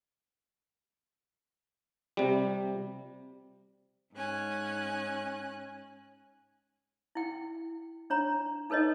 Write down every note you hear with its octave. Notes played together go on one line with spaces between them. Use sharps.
C3 G3
G#2 C#4 G#5 F#6
E4 G5
D4 C#5 A#5
D#4 A4 B4 C#5 D#5